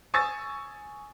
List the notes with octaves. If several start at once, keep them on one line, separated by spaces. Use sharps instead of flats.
G#5 C#6 D#6 E6 A6